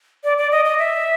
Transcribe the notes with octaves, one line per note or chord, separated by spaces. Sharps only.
D5
D5
D#5
D#5
E5